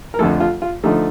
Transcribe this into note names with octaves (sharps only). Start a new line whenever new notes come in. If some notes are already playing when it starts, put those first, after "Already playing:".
A#4
F2 D3 F3 A3 A4
F4
F4
D3 F3 A3 D#4